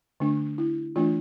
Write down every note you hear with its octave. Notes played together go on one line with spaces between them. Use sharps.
D3 A3 D4
E4
E3 A3 D4 F4